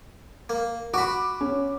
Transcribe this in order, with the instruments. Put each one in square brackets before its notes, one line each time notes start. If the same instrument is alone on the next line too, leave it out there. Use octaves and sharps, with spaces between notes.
[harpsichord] A#3
[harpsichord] F#4 B5 [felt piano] D6
[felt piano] C#4